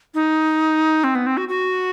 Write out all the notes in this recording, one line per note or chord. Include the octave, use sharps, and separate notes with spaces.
D#4
C4
B3
C4
F#4
F#4